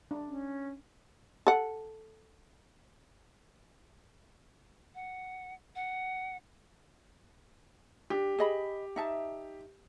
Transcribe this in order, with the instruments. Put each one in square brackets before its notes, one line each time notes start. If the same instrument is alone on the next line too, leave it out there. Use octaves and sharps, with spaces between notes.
[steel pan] D4
[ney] C#4
[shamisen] A4 F#5
[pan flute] F#5
F#5
[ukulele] D4 [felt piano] G4
[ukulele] G#4 D#5 B5
D#4 E5 A5